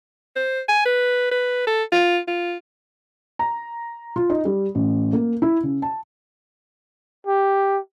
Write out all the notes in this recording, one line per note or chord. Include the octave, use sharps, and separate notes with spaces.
C5
G#5
B4
B4
A4
F4
F4
A#5
F4
D#4
G3
A1
A#3
E4
C#3
A5
G4